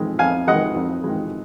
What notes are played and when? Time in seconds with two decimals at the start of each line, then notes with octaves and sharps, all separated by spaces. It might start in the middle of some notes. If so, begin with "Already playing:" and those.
Already playing: F2 D#3 G#3
0.19 F2 F5 G#5
0.48 D#3 G#3 D#5 F#5
0.76 F2
1.04 D#3 G#3